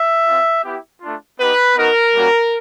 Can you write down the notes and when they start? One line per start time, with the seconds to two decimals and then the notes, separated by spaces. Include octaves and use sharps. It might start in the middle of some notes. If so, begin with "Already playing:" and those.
Already playing: E5
0.26 C4 F4
0.64 B3 E4 G4
1.00 A3 D4 F4
1.39 B3 D#4 G4 B4
1.76 B3 D#4 F#4 A#4
2.13 G3 A#3 C#4 F#4